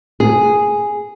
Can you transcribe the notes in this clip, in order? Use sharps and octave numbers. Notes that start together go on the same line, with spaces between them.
G#4